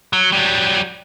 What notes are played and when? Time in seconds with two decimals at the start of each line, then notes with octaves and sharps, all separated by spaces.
0.13 F#3
0.32 F#3 G3